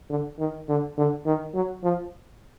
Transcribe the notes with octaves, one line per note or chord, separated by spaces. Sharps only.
D3
D#3
D3
D3
D#3
F#3
F3